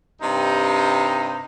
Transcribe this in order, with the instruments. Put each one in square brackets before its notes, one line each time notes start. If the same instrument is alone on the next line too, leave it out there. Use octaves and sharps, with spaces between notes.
[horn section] G2 C3 D#4